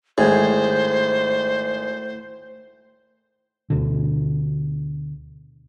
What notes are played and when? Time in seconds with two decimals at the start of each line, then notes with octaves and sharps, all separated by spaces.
0.18 G#1 A2 G#4 C5
3.70 D2 B2 D3